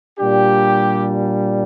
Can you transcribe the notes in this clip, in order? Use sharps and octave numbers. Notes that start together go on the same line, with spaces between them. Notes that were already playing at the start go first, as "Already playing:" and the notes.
A#2 G3 D4 G4